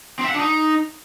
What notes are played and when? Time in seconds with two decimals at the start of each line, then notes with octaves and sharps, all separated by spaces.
0.19 C4
0.24 E5
0.29 F#5
0.34 D4
0.40 D#4